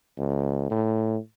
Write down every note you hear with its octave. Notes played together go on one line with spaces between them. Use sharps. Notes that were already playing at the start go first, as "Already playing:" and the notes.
C#2
A2